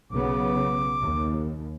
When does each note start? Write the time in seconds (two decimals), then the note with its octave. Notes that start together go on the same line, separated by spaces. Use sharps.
0.12 B1 C#3 B3 D6
1.01 D#2